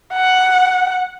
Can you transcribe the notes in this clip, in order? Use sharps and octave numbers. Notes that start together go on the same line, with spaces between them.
F#5